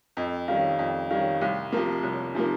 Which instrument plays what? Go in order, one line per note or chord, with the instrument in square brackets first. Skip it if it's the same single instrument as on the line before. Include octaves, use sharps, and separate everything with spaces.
[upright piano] F2 [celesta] D#5
[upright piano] D#3 G3 C#4 [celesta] F5
[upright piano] F2
[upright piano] D#3 G3 C#4 [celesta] F5
[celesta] F5
[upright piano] C2 [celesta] G5
[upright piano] C3 F3 A#3
[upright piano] C2 [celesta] C#5
[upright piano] C3 F3 A#3 [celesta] D#4